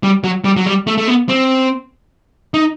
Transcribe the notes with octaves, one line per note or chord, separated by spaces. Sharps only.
G3
F#3
G3
F#3
G3
A3
A3
B3
C4
D#4